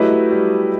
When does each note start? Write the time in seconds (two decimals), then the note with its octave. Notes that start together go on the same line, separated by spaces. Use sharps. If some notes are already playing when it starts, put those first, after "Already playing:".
Already playing: F#3 A3 E4 G4 B4 D#5
0.10 F#3
0.30 G3